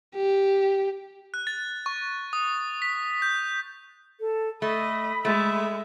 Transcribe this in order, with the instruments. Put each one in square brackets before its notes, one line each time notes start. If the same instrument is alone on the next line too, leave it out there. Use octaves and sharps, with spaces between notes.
[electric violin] G4
[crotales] F#6
A6
C#6
D#6
B6
G6
[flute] A4
[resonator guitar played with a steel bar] A3 [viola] D#5 [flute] B5
[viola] G#3 [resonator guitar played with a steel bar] A3 [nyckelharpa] E5